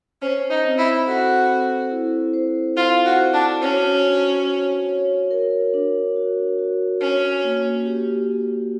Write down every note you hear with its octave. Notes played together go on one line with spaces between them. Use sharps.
C#4 C5
D#4
C4
E4
F#4 A4
C4
E4
C5
F4 C5
F#4
C5
D4
C#4 F#4
D4
C#5
C#5
A#4
D4
F#4
F#4
C#4 D4
A#3
G4
G4